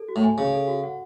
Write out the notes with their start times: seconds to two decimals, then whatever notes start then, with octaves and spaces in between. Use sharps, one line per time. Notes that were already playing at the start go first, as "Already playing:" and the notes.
Already playing: A4
0.08 F#4
0.16 A2
0.24 G#5
0.38 C#3 C#5
0.53 A4
0.68 F#4
0.83 F#5